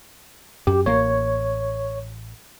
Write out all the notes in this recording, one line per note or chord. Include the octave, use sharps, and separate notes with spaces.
F#2 G4
A1 A#3 C#5